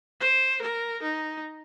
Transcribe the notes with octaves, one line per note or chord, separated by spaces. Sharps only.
C5
A#4
D#4